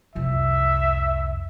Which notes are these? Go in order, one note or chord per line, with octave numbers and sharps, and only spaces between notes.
C2 F2 E5